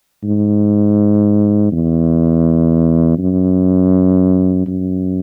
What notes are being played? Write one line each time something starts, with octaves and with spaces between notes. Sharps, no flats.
G#2
E2
F#2
F#2